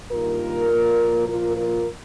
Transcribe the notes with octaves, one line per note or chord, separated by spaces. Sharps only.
G2 D#3 G3 A#3 F4 A#4
A#2 F3 A#3
A#2 F3 A#3 F4 A#4
F4 A#4